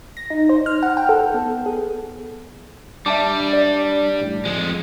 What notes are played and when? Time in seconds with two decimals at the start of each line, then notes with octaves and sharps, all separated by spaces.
0.17 A#6
0.30 D#4
0.49 C5
0.66 F6
0.83 F#5
0.97 G5
1.09 A4
1.34 B3
1.66 G#4
3.06 G3 D4 E5 A5 D6
3.53 D5
4.21 A1
4.45 F2 F3 G#3